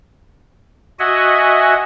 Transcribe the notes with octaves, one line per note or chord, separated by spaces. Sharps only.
F#4 D#5 E5 F#5 G#5